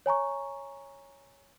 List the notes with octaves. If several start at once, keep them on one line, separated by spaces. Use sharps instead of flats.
C#5 G#5 A#5 C#6